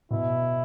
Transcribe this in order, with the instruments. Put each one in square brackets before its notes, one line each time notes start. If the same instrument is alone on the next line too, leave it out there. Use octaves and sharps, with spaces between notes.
[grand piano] B2 [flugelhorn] E4